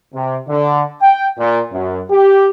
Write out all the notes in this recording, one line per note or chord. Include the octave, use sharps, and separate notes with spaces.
C3
D3
G5
A#2
F#2
G4